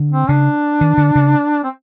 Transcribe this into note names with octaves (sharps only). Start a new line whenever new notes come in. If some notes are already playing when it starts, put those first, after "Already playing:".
Already playing: D3
C4
C#3 D4
D#3
D3
C#3
C4